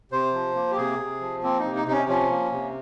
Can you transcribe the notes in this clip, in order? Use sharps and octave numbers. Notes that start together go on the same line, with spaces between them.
C3 C5
F3
A#3
G4
C3 G#4
C3
F3
A#3 C4
D#4
C3
D#4
C3 D#4
C#4
F3 C#4
A#3
C3